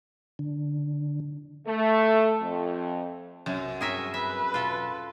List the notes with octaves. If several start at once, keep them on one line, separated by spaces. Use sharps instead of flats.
D3
A3
F2
B1 F#2 C3
G2 C4 G#4 A#4 C#5 E5
B4 E5
E1 B2 F4 A4